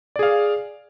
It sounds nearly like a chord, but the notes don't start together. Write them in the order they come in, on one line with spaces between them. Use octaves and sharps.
D5 G#4 F5